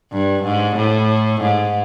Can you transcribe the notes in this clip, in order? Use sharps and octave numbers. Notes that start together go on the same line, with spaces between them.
G2
G#2
A2
G#2